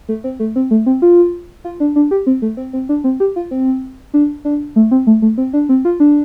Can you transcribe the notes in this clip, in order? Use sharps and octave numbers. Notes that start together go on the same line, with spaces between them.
A3
C4
A3
C4
A3
C4
F4
F4
D4
D4
G4
C4
A3
C4
C4
D4
C4
G4
F4
C4
D4
D4
A3
C4
A3
A3
C4
D4
C4
F4
D4